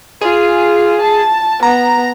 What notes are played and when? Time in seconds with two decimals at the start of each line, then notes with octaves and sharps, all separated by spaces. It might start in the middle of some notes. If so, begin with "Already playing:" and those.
0.21 F4 G#4
1.01 A5
1.63 B3 A#5